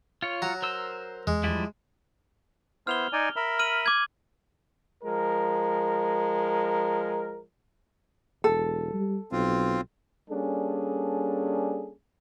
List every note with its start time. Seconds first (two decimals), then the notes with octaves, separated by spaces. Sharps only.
0.22 F4 C#5
0.42 F#3 A#5
0.62 A#4 C5 E6
1.27 E2 G#3
1.44 F3 G3 E4
2.87 B3 E4 C5 F6 F7 G7
3.13 D#4 D5 G#5
3.36 A#4 E5 B5
3.59 F6 D#7 F#7
3.86 D6 G#6
5.04 F3 G#3 A#4
8.44 E1 A4
8.94 G3
9.32 B1 C4 F4
10.30 G3 A#3 C#4 D4 G#4 A4